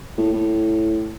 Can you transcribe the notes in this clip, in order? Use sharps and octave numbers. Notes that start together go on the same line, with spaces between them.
A2
A2